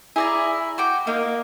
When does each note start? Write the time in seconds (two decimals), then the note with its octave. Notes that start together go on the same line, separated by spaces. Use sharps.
0.16 E4 G#4 D5 A#5
0.78 F#4 G5 D6
1.07 A#3 D#4